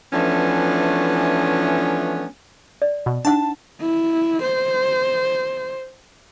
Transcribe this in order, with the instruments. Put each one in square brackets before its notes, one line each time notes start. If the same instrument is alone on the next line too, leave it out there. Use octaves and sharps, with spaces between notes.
[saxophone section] E3 F3 A3 B3 C#4 D4
[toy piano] D5
[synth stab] B2
[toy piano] D4 D#4 F#5 [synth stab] A5
[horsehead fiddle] E4
C5